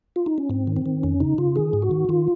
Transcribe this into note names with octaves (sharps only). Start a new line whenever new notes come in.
F4
D#4
C#4
G#2 C4
D#3
C4
D#3
F2 C#4
C#3 D#4
C#3 F4
D#3 G#4
G#2
F#4
D#3
D#3 F4